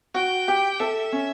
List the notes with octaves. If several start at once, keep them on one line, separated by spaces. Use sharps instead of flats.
F#4 G5
G4
A4 E5
C#4